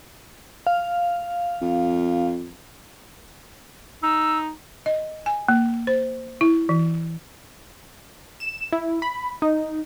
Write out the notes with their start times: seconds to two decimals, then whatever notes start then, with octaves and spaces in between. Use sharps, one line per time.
0.67 F5
1.61 F2
4.03 D#4 E6
4.86 D#5
5.26 G#5
5.49 A#3
5.87 C5
6.41 E4
6.69 E3
8.40 E7
8.72 E4
9.02 B5
9.42 D#4